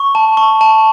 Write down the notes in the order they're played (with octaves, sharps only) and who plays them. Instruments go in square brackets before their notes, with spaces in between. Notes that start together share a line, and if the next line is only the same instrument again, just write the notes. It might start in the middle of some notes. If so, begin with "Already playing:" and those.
Already playing: [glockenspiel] C#6
A5
C#6
A5